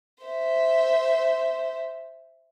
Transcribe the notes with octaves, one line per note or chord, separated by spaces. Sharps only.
C5 E5